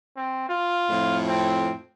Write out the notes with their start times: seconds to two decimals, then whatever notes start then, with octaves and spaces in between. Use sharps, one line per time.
0.17 C4
0.49 F4
0.90 F2 A2
1.28 C4